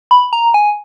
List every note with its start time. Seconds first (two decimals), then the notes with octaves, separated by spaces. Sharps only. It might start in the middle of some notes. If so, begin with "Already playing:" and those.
0.11 B5
0.33 A#5
0.54 G#5